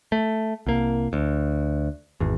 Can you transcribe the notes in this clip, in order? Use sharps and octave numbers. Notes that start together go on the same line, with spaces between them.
A3
C2 A#3
D2
G#1 E2